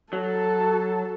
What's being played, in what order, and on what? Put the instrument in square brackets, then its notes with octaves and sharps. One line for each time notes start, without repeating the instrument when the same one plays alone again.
[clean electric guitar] F#3 [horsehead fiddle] A4 A5